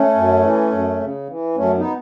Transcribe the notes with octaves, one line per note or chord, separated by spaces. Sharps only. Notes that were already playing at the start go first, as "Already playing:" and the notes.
Already playing: A3 C#4
F#2
E3
F#2
C#3
E3
F#2 A3 C#4
B3 D#4